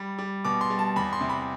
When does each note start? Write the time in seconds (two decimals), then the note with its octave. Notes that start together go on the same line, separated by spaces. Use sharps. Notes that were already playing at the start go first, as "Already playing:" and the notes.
Already playing: G3 B5
0.19 G3
0.45 B2 D6
0.61 C6
0.70 G3
0.79 A5
0.96 E2 B5
1.13 C6
1.21 C3
1.29 B5